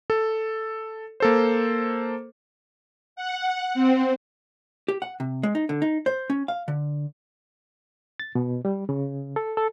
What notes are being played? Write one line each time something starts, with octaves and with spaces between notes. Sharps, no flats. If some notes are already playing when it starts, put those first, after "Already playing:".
A4
A#3 A4 C5
F#5
C4
G4
F#5
C3
G#3
D#4
D3
D#4
C5
C#4
F5
D3
A6
B2
G3
C#3
A4
A4